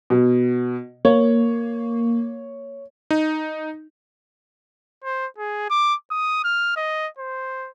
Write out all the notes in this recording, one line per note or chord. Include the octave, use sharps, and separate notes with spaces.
B2
A#3 C#5
D#4
C5
G#4
D6
D#6
F6
D#5
C5